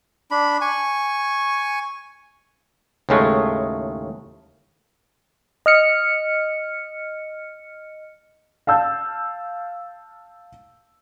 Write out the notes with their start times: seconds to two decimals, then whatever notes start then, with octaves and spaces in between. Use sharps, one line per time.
0.31 D4 B5
0.61 G#5 C#6
3.09 D#2 A2 C#3 G#3 A3
5.66 D#5 F6 C#7
8.67 F5 A5 E6 G6